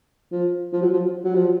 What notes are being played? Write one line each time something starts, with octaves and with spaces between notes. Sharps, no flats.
F3
F3
F#3
F3
F#3
F3